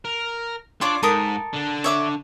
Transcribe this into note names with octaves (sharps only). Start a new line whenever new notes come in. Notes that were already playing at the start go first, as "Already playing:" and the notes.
A#4
D4 F4 C#5 D5 D6
G#2 A4 A#4 D#6
D3 D4
C#5 E5 D6